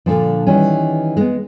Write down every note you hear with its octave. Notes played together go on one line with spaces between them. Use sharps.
A#2 D3 E3 F3
D#3 E3 G3 C#4
G#3 B3